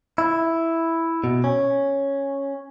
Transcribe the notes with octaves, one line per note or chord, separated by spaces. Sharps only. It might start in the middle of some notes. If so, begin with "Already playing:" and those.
E4
B2
C#4